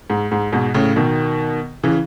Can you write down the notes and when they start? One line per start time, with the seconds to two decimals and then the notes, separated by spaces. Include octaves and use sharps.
0.10 G#2
0.31 G#2
0.52 G#2 B2
0.74 A2 C#3
0.96 B2 D#3
1.83 C#3 E3